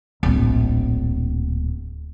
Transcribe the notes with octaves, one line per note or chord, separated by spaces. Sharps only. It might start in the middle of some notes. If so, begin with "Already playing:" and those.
D1 A#1